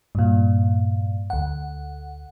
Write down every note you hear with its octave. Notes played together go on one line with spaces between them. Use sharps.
G2 A#2
D2 F#5